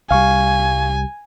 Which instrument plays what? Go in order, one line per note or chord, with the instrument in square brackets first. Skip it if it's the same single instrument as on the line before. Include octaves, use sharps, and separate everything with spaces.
[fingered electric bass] C2 G3 [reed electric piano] F5 C#6 [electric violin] G#5